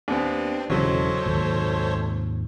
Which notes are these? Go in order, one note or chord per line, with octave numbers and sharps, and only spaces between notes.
D#2 B3 C4 D4
E1 B1 C#3 E3 F#3 A4 C5 C#5
G#1 D#2 A#2